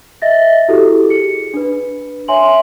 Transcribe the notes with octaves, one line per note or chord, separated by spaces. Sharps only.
D#5 E5 A6 A#6
E4 F#4 G4 A4
G#4 C#7
D4 B4
C#5 E5 G#5 C6 F#7